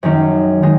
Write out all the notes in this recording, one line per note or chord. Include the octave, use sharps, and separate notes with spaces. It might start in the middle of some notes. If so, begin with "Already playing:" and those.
F#2 D#3 G#3 C#4
D#3 G#3